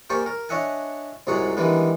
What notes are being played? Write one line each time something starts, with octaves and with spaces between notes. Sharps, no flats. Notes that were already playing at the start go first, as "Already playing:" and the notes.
A#3 G4 C5 D5 G#5 C#6
A#4
D4 C#5 D#5 E5 F#5 G#5
C2 G#2 F#3 G#4 C#5 F#5
D#3 E3 G3 G#3 B3 D4